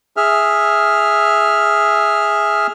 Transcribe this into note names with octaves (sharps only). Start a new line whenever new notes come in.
G#4 E5 F6